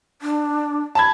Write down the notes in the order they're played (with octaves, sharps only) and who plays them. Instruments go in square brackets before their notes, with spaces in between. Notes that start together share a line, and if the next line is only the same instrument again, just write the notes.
[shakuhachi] D4
[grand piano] A5 B5 G#6